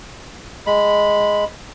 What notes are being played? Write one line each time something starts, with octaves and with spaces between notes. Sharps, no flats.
G#3 B5